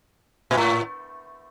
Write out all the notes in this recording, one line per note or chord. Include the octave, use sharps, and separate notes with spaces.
A#2
A2